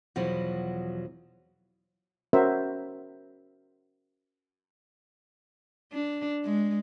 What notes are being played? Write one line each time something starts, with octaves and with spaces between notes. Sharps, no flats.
E2 B2 F3 F#3
C#4 F#4 A#4 C5 E5
D4
G#3